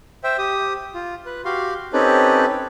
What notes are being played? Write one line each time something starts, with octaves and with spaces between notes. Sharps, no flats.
C5 E5 G5
G4 D#6
F4
B4
F#4 G4 F5 C6
C4 C#4 D#4 G4 A4 B4